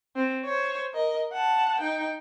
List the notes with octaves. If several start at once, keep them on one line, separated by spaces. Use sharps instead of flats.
C4
C5 C#5
A#4 D#5
F#5 A5
D#4 G5